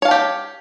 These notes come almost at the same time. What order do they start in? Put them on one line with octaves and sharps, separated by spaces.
C#5 F5 A5 G4